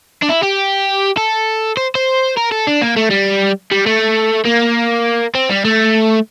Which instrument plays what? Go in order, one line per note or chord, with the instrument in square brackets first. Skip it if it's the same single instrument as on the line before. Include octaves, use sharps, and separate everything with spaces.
[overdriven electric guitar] D4
E4
G4
A4
C5
C5
A#4
A4
D4
A#3
A3
G3
G3
A3
A#3
C4
G3
A3